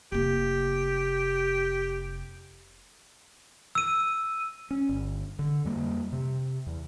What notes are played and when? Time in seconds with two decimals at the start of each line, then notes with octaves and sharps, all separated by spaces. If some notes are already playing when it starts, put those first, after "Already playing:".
0.12 F1 A#3 G4
3.75 E6 D#7
4.71 C#4
4.89 G1
5.39 D3
5.65 F2 G3 A#3
6.12 C3
6.67 E2